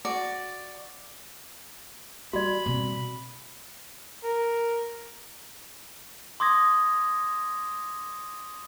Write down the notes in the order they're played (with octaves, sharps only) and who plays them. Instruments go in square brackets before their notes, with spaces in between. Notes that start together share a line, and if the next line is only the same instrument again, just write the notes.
[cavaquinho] F#4 D5
[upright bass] G3 [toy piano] F#4 D5 [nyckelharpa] B5
[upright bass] B2 C4
[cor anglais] A#4
[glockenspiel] C6 D6 D#6 G#6 A#6